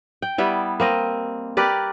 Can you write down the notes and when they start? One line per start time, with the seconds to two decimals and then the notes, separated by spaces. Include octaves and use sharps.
0.22 G5
0.38 G3 B3 E4
0.80 A#3 C4 D#5
1.57 G4 A#4 B4 D5